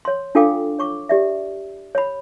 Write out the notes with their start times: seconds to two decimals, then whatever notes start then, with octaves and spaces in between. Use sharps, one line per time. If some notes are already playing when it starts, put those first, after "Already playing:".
0.05 C#5 C6
0.35 D4 F4 A4 F5 G5 D6
0.79 C#5 C#6 D6
1.09 G4 D5 E5
1.95 C#5 B5